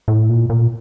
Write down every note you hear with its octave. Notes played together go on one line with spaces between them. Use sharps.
A2
A#2
A#2